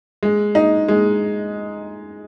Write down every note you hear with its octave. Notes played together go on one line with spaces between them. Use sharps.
G#3
D#4
G#3